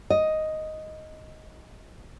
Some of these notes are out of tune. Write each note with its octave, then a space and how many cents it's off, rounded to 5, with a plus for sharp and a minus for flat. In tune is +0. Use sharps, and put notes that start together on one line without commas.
D#5 +5